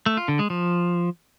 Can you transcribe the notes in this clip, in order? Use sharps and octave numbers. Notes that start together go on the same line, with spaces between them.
A3
F4
D3
G#3
F3